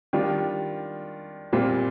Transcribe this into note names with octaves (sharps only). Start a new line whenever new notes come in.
D#3 G3 D4 F4
A#2 G3 C4 F4